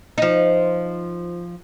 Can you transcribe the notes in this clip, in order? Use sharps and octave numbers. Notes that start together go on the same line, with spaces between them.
F3 D#4